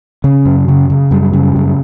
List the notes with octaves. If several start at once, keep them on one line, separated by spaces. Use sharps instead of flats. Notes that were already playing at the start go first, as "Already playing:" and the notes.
C#3 C#4
F#2
C#3
C#3
F#2 G3
C#3
F#2